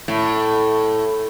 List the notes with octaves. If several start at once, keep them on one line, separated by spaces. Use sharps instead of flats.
A2